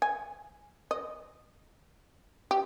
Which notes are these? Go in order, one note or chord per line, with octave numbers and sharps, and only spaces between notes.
G#5
D#5
G4